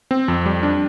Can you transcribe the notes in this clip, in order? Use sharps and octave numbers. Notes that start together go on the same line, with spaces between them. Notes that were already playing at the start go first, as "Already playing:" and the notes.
C4
F2
G3
D4